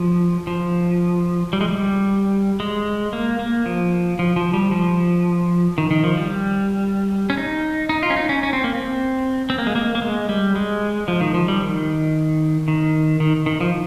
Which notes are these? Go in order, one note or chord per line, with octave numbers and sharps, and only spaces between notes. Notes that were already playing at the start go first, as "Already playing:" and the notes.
Already playing: F3
F3
G3
G#3
G3
G#3
A#3
A#3
F3
F3
F3
G3
F3
D#3
D#3
F3
G3
C#4
D#4
D#4
F4
C#4
D#4
C#4
C#4
C4
A#3
C4
C4
A#3
G#3
A#3
A#3
G#3
G3
G#3
F3
D#3
F3
G3
D#3
D#3
D#3
D#3
F3